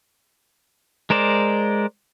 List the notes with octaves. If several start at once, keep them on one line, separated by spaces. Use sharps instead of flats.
G#3 A#4 C5 D5